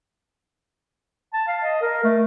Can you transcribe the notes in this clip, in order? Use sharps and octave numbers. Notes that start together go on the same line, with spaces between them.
A5
F5
D#5
A#4
A3